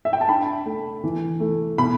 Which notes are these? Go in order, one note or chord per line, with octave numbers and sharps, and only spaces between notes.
E5
G5
A5
D4 B5
A3
E3
A3
B2 B5